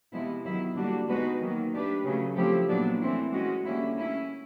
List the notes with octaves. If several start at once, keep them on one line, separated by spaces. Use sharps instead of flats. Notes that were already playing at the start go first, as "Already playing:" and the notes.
C3 F3 G#3 B3 E4
D#3 F#3 B3 E4
D3 G3 A#3 D4 F#4
G#3 B3 D#4 F#4 B4
D#3 F#3 A#3
A3 D4 G4 B4
C#3 F#3 A3
F3 A3 C4 E4 G4
A#2 F#3 B3 D4
E3 A3 C4 E4
G#3 C#4 F#4
D3 G3 A#3 C#4 E4
A3 C#4 E4